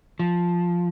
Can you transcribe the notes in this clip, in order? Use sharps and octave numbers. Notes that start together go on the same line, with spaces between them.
F3